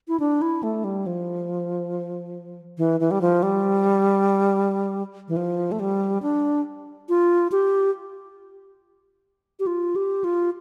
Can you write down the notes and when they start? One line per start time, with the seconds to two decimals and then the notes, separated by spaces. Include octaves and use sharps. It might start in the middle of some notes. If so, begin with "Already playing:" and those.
0.08 E4
0.20 D4
0.42 E4
0.63 A3
0.84 G3
1.06 F3
2.78 E3
3.00 E3
3.11 G3
3.21 F3
3.43 G3
5.28 E3
5.37 F3
5.72 A3
5.80 G3
6.22 D4
7.09 F4
7.52 G4
9.59 G4
9.67 F4
9.96 G4
10.24 F4